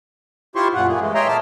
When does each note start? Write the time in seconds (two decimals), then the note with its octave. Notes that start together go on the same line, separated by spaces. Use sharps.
0.56 E4 F4 G4 C5 C6 C#6
0.74 F#2 A#2 F4 F#5
0.88 A3 A#3 G#4
1.00 E3 G#3
1.15 C#5 D#5 E5 G5 A#5 C6
1.28 A#2 A5 D6 E6 F6